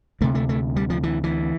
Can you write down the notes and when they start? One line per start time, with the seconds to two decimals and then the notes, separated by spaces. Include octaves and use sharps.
0.21 D2 C3 A3
0.35 A3
0.49 A3
0.76 G3
0.90 F3
1.03 E3
1.24 E3